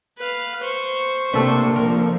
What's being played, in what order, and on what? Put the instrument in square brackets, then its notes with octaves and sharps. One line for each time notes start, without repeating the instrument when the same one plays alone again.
[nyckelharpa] B4 F5
C5 C#6
[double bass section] C3 [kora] A3 A4 B4 [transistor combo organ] A#3 D4
[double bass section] F3 [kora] A#4